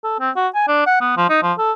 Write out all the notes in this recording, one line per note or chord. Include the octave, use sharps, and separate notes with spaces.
A4
C4
F#4
G#5
D4
F#5
B3
F3
D#4
F3
A4